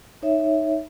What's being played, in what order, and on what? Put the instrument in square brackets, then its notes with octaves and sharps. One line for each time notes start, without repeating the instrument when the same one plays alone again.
[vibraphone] D#4 C#5 E5